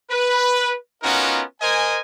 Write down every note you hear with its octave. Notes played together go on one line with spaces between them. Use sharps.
B4
B3 C#4 D#4 F4 F#4 A#4
A#4 C5 D#5 G#5